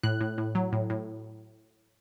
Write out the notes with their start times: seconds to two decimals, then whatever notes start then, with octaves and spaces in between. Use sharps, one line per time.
0.03 A2 F#6
0.21 A2
0.38 A2
0.55 F#3
0.72 A2
0.90 A2